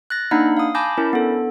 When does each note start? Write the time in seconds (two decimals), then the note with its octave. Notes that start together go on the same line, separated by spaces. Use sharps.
0.10 F#6 A6 A#6
0.31 A#3 D4 D#4 F#5 B5
0.57 F5 D#6
0.75 G#5 A5 B5 D6 G6 A#6
0.98 C#4 E4 A#4
1.13 B3 D4 A4